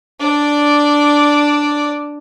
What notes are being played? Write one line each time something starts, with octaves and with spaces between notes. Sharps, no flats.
D4 D5